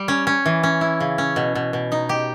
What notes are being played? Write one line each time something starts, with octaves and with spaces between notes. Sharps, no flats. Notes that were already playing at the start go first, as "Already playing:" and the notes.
Already playing: G3
C#4
C#4
E3
C#4
E4
C#3
C#4
B2
B2
B2
D#4
G4